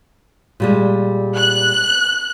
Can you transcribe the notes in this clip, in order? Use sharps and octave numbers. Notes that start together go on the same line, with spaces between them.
A#2 G3 G#3
F#6